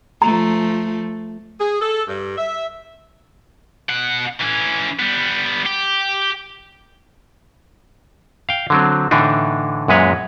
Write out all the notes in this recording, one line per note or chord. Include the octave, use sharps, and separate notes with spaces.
F3 A3 A#5
G#4
A4
G2
E5
B2 F#5
E3 C#4
G3 B3
G4
F5 G5
D3 F#3 C4
A2 D3 E3 D4 D#4
F#2 A#2 G#3 B4 C#5